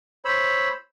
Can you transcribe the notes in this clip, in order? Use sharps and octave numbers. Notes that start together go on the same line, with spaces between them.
C5 C#5 B5 E6